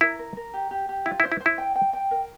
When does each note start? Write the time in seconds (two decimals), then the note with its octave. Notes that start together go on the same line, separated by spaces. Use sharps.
0.01 E4 A#4
0.19 A#4
0.37 A#4
0.54 G4
0.71 G4
0.89 G4
1.06 E4 F4
1.20 E4
1.23 C5
1.32 E4
1.40 C5
1.46 E4
1.58 G5
1.76 G5
1.93 G5
2.11 A#4